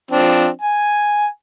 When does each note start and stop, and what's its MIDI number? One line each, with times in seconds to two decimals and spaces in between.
0.11 0.48 53
0.11 0.48 60
0.11 0.48 62
0.62 1.26 80